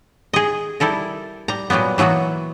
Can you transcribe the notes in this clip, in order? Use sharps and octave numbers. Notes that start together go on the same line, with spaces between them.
G#4 D#5
G3 E4 A4 A#4
G3 A#5
A#2 F#3 G3 A#3 B3
E3 F#3 A#3 B3 F#4